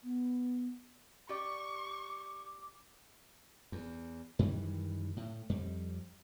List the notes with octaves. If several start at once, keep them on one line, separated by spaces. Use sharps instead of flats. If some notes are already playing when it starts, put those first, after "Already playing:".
B3
G4 D5 C#6 D6
E2
F#2 D#3 E3 G3
A2
F2 G3